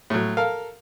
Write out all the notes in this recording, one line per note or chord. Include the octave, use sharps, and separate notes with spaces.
A2 F#3
A4 A#4 F5